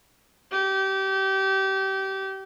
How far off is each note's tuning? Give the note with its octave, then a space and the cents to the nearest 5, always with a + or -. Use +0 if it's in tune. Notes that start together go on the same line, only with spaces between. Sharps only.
G4 -25